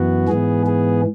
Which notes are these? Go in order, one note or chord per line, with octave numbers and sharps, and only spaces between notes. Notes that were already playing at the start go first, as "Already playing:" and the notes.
Already playing: F#2 E3 B3 F#4
G#2 E3 B3 G#4
G#4